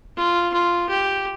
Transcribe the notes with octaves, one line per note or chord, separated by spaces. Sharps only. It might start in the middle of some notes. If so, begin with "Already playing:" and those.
F4
F4
G4